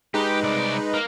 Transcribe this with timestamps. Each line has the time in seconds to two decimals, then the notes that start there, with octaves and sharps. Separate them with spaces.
0.14 G#3 D#4 G4 B4
0.43 C2 D5
0.94 A#3